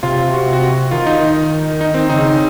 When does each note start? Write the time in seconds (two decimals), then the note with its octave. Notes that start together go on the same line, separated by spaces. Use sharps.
0.03 C3 F4
0.33 F#4
0.53 F#4
0.91 D#3 F4
1.07 D#4
1.21 D#3
1.81 D#4
1.94 C4
2.10 C#3 D#4